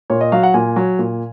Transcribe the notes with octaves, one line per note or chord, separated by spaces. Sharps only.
A#2 C#5
D#5
F#3 F5
F#5
A#2 G#5
F#3
A#2